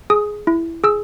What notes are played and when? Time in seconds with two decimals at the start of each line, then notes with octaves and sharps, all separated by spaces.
0.10 G#4 D#6
0.47 E4
0.84 G#4 E6